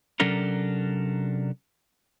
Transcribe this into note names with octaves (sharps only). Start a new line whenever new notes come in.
C3 F#3 C#4 D4 A4 A#4